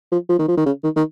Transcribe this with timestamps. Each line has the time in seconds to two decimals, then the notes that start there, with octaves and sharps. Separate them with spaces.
0.12 F3
0.29 F3
0.39 D#3
0.48 F3
0.57 D#3
0.66 C#3
0.84 D#3
0.96 D#3